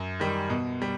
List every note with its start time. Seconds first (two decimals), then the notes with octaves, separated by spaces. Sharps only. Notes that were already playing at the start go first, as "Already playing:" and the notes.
Already playing: F#2
0.20 D#3 G3
0.50 B2
0.82 G3